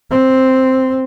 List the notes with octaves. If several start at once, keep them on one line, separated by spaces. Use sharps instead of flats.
C4